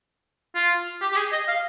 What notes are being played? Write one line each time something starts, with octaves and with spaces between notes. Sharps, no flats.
F4
G4
G4
G#4
D#5
F5